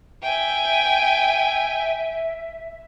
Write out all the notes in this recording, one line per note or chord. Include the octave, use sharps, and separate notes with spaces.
E5 G5 G#5